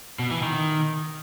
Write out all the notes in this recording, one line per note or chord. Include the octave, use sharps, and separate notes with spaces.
B2
E3
D#3